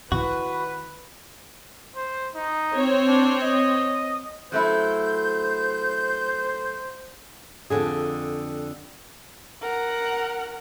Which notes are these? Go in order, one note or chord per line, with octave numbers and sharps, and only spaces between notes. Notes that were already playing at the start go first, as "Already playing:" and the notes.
D#3 E4 F#4 B4
C5
D#4
C4 C5 C#5
D4
D#5
F#3 A3 E4 C5 G6
F2 G#2 D3 G#4
A#4 F#5